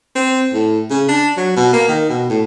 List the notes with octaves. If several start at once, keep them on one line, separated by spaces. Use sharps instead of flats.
C4
A2
C#3
D4
F#3
B2
A#3
D#3
B2
A2